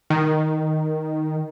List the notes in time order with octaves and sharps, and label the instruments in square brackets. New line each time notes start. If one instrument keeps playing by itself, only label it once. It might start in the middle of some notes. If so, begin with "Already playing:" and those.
[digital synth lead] D#3